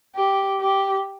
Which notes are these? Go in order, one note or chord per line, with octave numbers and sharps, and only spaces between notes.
G4
G4